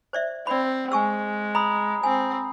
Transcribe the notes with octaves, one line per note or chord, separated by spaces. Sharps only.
C5 D5 E5
C4 D5 B5
G#3 G#5 C#6 E6
A#5 B5 D#6
C4 G#5